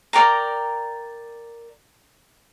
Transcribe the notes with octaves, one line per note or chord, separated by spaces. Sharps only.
A#4 D5 G5 A#5